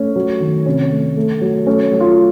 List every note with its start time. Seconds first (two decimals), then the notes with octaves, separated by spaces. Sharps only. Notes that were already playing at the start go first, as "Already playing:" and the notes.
Already playing: A3 C#4
0.16 F#3
0.41 D#3
0.66 C3 C#4
0.92 A3
1.17 A3
1.41 F#3
1.67 A3 C#4
1.92 F#3
2.00 F4